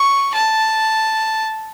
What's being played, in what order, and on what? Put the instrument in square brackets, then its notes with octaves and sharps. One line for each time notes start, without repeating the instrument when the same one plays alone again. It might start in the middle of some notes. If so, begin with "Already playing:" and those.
Already playing: [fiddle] C#6
A5